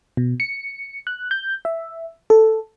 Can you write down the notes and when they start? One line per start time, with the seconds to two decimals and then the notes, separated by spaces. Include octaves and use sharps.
0.17 B2
0.40 C#7
1.07 F#6
1.31 G6
1.65 E5
2.30 A4